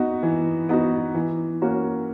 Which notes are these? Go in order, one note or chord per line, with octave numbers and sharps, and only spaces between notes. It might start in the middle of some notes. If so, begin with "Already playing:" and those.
Already playing: B3 D#4 F#4
E3
B3 D#4 F#4
E3
A#3 C#4 F#4